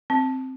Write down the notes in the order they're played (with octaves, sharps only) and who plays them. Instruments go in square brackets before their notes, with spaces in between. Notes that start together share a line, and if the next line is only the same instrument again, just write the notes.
[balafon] C4